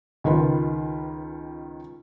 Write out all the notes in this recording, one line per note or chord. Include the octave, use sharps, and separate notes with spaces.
C#2 D#3 F4 B4